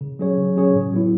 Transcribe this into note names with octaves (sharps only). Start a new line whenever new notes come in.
C#3
F#3 C#4 G#4 C#5
C#3
F#3 C#4 G#4 C#5
A2
F#3 B3 E4